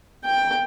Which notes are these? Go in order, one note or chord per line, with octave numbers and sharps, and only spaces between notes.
G5